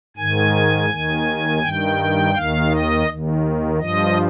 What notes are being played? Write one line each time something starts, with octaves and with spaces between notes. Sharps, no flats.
G#2 D#3 G#5
D#2 D#3
G2 D#3 G5
D#2 D#3 F5
D#5
D#2 D#3
G2 F3 D#5